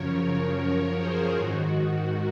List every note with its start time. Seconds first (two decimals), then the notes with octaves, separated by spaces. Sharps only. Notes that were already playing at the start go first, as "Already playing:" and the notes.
Already playing: F#2 C#3 F3 A#4 C#5
0.21 A#4 C#5
0.59 F#2 F3 A#4 C#5
0.98 G#4 C5
1.36 G#2 D#3 F#4